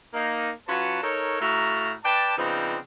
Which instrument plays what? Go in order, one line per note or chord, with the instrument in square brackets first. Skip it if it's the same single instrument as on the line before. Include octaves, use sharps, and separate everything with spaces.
[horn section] A#3 D#4
F#3 C#4 F4 B4 F#5 A5
D#4 A4 A#4 C#5
A2 A3 F#4 F5 A#5
B4 D5 G5 A5
C#3 F3 B3 C4 D4 D#4